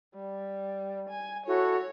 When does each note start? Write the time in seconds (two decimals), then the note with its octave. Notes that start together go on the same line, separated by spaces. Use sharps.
0.14 G3
1.10 G#5
1.46 E4 F#4 A4 C#5